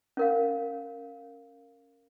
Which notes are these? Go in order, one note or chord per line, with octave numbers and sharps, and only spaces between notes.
C#4 A#4 F5